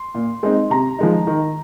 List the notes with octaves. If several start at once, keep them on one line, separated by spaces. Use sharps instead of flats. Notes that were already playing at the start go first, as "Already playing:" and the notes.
Already playing: C6
A#2
G#3 C4 D#4
C3 A#5
F3 G#3 D#4
D#3